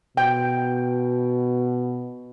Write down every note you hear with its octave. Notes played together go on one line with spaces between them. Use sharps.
B2 G5